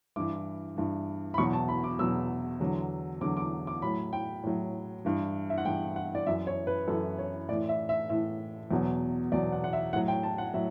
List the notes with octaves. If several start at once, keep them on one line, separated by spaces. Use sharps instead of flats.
G2 E3 D6
G2 E3
B5
E2 B2 F#3 C#6
A5
B5
D6
E2 B2 F#3 E6
E2 D3 F#3
E2 D3 F#3 D6
D6
D6
A2 F#3 B5
G5
A2 F#3
G2 E3
E5
F#5
G2 E3 G5
F#5
D5
F#2 E3 E5
C#5
B4
F#2 E3 A4
C#5
A2 E3 D5
E5
E5
A2 E3 E5
E2 B2 F#3
E2 B2 F#3 D5
F#5
F#5
E5
A2 F#3 F#5
G5
A5
F#5
A2 F#3 E5